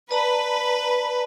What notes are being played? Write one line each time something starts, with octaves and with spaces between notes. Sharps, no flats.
B4 D5 A5 A#5